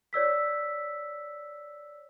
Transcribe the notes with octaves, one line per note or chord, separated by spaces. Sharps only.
C#5 D5 E6 B6